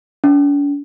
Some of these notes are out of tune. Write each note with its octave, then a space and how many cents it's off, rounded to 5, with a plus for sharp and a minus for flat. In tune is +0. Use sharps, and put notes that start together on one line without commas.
D4 -45